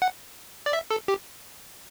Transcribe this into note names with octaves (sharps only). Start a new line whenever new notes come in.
F#5
D5
E5
A4
G4